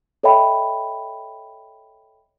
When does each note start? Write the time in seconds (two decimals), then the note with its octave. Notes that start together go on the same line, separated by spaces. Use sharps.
0.23 A4 C#5 D#5 E5 G5 B5